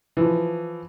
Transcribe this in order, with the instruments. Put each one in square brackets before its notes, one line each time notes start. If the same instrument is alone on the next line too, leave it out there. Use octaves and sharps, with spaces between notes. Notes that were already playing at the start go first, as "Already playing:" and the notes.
[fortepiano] E3 F3